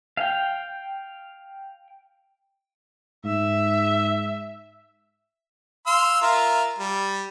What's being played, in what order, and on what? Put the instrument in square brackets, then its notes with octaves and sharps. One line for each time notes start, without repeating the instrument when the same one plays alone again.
[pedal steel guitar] F5 G5
[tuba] G#2 [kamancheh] E5
[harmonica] F5 C6 E6
F4 A#4 E5
G3